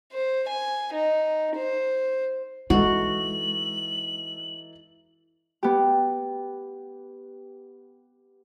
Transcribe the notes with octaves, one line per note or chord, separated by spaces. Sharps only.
C5
G#5
D#4
C5
E3 G#3 D#4 F#4 A4 F#7
B3 G4